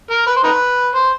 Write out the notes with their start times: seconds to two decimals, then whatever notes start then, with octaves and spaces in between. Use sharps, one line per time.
0.10 A#4
0.26 B4
0.36 C5
0.43 D#4 B4
0.95 C5